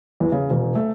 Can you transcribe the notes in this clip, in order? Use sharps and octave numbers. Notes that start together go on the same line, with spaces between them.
E2
C#3
E1
A3